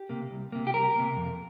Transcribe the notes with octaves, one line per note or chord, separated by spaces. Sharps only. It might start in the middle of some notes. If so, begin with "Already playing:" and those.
Already playing: G4
C3 A#3
C2
C3 A#3
G4
C2 A#4
C3 A#3
F2